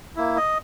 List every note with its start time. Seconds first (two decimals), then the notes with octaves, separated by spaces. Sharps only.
0.16 A#3 E4
0.37 D#5